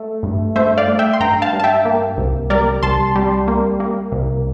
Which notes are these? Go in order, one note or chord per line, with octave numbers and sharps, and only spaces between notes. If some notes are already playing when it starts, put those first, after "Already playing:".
Already playing: A3
G2
A3 C5 E5
D5 F5
A3
E5 G5
C6
G2 G5 A#5
F5 A5
G2
A5
E5 G5
A#3
C2
G3 A#4 D5
C2 A5 C6
G3
A#3
A#3
C2